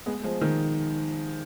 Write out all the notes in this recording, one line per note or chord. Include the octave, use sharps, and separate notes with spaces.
G#3 B3
F3 G#3
D#3